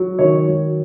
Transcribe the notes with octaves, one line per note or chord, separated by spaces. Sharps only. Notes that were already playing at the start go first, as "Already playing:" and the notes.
Already playing: F#3
D#3 C#5
F#3